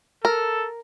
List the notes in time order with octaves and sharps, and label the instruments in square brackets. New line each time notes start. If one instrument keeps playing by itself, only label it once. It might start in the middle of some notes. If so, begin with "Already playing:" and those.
[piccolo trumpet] A4 [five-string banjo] A#4